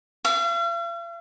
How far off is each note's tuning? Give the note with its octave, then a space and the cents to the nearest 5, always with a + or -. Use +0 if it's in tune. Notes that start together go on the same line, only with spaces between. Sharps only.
F5 -45